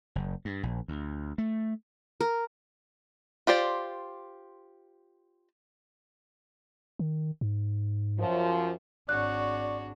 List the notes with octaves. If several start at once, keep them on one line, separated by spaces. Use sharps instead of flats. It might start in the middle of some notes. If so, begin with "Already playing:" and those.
F#1
G2
A#1
D2
A3
A#4
F4 G4 C5 D5
D#3
G#2
F#2 F3
G#1 D4 F#4 C#5 D5 F#6